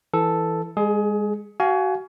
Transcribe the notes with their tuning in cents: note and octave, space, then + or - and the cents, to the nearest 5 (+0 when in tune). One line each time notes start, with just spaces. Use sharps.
E3 +0 A4 +0
G#3 -25 G#4 +25
F#4 +25 F5 +0 G#5 +20